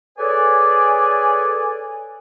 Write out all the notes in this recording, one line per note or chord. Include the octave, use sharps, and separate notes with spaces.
G#4 A4 B4 C#5 D5 G#5